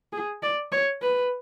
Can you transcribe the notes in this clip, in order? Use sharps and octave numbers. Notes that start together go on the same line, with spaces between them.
G#4
D5
C#5
B4